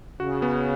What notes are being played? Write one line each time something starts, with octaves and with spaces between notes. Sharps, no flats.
C#3 F#4
B3